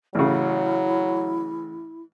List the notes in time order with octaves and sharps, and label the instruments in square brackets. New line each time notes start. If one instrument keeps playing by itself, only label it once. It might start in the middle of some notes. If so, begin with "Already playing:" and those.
[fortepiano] A1 C#3 [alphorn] F#3 [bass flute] E4